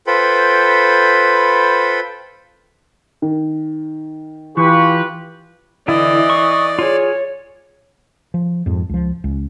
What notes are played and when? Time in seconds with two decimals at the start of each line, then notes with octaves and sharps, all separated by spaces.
0.07 F4 A4 B4 C5 G5 B5
3.22 D#3
4.57 E3 F4 G4 B4 C#6
5.88 D3 E3 E4 D5 D#5
6.30 C#6
6.79 F4 G#4 C#5
8.34 F3
8.66 F2 G#2
8.89 C#2 F3
9.24 C#2